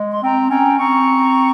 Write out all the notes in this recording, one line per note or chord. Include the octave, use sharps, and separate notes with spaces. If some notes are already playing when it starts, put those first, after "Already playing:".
Already playing: G#3
C6
C4 G5 A#5
C#4 G5 A#5
C4 A#5 C#6